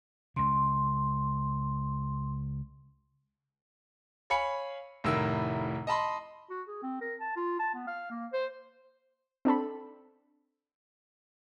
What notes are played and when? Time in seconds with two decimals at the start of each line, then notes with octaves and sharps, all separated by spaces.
0.36 C#2 C#3 C6
4.30 C#5 F5 G#5 B5 C#7
5.04 F1 A2 D#3 E4 A#4 E6
5.87 D#5 A5 B5 C6
6.50 F#4
6.68 G#4
6.82 C4
7.01 A#4
7.20 A5
7.36 F4
7.59 A5
7.74 B3
7.87 F5
8.11 A#3
8.33 C5
9.45 C4 D4 A4 B5